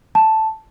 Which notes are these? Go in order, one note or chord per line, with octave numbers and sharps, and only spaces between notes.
A5